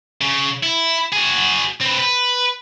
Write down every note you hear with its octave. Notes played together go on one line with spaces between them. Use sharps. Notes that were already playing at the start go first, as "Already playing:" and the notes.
C#3
E4
F#4 G#4
C4 B4
B4